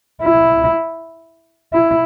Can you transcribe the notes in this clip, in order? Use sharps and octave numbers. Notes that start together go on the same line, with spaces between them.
E4
E4